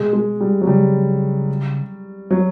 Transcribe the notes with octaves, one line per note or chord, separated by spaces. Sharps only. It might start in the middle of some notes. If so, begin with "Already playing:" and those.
Already playing: B2 G#3
G#3
G3
F#3
C#3 G3
F#3